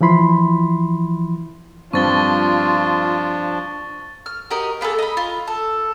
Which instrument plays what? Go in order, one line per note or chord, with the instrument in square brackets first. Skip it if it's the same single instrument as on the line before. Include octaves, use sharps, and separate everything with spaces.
[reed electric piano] E3 F3 E4 B5 C6
[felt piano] G2 C4 [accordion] F3 D4 [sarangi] F4 [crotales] C#6 A6 G7
[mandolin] F6
F#4 G4 A#4 D#5
A#3 B3 G#4 A4
D#5 B5
F4
A4